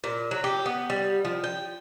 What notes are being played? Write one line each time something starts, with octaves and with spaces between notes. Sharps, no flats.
A#2
F#3
G4
B3
G3
F3
G5